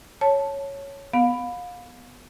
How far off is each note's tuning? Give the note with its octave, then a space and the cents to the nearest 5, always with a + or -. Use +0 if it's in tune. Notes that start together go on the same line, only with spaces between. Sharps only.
C#5 +0 A5 +0
B3 +0 F5 +35